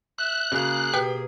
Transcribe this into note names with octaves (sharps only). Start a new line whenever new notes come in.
E5 F#6
C#3 A#3 F#4 G#4 F5
B2 G4 B4 G5